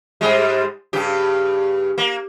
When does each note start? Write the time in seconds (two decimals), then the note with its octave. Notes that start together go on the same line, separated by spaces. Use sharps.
0.21 G#2 G3 G#3
0.93 G2 C#3 G4
1.98 A#3